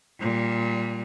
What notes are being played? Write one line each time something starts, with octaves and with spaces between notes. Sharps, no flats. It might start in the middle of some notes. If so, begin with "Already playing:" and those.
A#2 G3